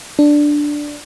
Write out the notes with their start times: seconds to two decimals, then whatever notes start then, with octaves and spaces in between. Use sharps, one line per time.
0.19 D4